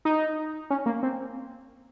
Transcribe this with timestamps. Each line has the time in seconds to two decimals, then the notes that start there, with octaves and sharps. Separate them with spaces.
0.05 D#4
0.70 C#4
0.86 A#3
1.03 C4